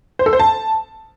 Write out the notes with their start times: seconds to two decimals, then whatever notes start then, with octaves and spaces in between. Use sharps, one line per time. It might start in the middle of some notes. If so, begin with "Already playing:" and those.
0.19 C5
0.26 A4
0.33 C5
0.40 A5